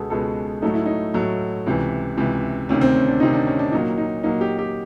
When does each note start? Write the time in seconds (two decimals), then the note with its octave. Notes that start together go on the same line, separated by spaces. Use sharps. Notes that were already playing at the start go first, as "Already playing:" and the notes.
Already playing: C#2 B2 G#3 B3 G#4 A4
0.10 C#2 B2 G#3 B3 A4
0.62 A2 F#3 A3 D#4
0.74 E4
0.86 D#4
1.14 A2 F#3 A3
1.66 C#2 C3 E3
2.17 C#2 C3 E3
2.69 D2 C3 D#3 C#4
2.81 C4
2.95 C#4
3.08 D4
3.20 D2 C3 D#3 D#4
3.33 D4
3.47 C#4
3.59 D4
3.72 A#2 F#3 A#3 D#4
3.98 D#4
4.23 A#2 F#3 A#3 D#4
4.41 G4
4.58 G4